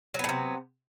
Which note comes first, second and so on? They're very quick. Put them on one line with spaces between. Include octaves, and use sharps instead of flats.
F#3 B3 A2 C3